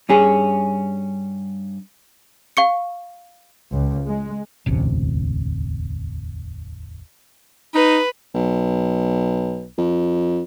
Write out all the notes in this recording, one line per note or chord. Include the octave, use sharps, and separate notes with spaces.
G2 C#4 G#4
F5 C#6 C#7
C#2
G#3
E1 A1 D2 C3
D#4 B4
B1
F2